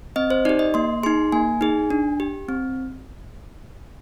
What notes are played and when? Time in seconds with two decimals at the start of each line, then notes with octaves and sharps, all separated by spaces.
0.16 C4 D#5
0.30 C5
0.45 D#4 G4 D5
0.59 D#5
0.74 A#3 C6
1.03 D#4 G#4 C6
1.32 A#3 G#5
1.61 D#4 G#4
1.90 D4
2.20 G4
2.49 C4